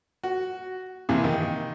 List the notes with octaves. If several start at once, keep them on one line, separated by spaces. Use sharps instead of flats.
F#4
A#1 C3 E3
D#3